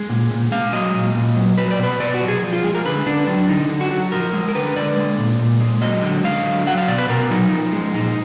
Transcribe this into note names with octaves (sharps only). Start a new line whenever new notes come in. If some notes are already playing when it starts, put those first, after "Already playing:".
Already playing: G#3
A#2
A#2
G#3 F5
F#3 D#5
A#2
A#2
F#3
F#3 B4
D5
B2 B4
B2 D5
F#4
F#3
G#4
F3
F4
G#3 G#4
A#4
D3 B4
D3 D4
F#3 D4
D3 D#4
D3
F#4
F#3 F#4
F3 A#4
G#3
A#4
D3 B4
D3 D5
G#3
A#2
A#2
G#3
F#3 D#5
D3
D3 F5
F#3
F#3 F#5
F5
B2 D5
B4
B2 A#4
F#3 D#4
F3
G#3
A#2 D#4